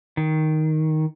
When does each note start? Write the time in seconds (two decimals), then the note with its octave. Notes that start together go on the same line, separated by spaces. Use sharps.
0.17 D#3